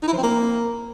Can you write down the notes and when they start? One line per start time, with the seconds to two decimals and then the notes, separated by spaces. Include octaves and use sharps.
0.02 D#4
0.08 E4
0.13 F3
0.18 C4
0.23 A#3